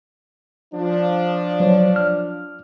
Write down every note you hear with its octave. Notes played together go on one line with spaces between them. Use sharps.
F3 D4
F#3 C5 C#5
F6